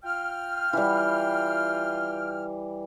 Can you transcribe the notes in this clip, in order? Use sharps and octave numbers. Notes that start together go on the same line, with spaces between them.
F4 G5 F6
E3 G3